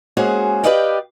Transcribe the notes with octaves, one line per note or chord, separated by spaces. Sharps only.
G#3 A#3 C#4 F#4 G#4 C5
G4 B4 D5 D#5 F5 G5